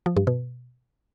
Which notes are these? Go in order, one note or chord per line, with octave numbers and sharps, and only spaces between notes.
F3
G2
B2